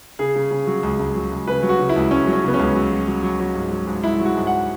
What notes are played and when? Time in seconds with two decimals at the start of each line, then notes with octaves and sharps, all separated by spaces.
0.19 C#3 G#4
0.35 C#3
0.51 C#3
0.67 F#3
0.83 C#2
0.99 C#2
1.16 F#3
1.31 C#2
1.48 C#3 B4
1.63 F#3
1.69 F#4
1.79 C#3
1.89 E4
1.96 C#2
2.11 C#2 C#4
2.27 F#3
2.33 C#4
2.44 C#3 B3
2.54 C#4
2.59 C#2
2.76 F#3
2.91 F#3
3.07 F#3
3.23 F#3
3.40 F#3
3.55 G#2
3.72 F#3
3.87 G#2
4.04 G#2 E4
4.20 F#3
4.25 F#4
4.36 G#2
4.47 F#5